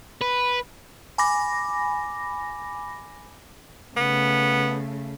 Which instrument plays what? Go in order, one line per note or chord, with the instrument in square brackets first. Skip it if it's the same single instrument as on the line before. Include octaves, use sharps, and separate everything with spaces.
[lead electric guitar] B4
[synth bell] G#5 B5 D6 A#6
[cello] C#3 A3 [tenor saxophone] B3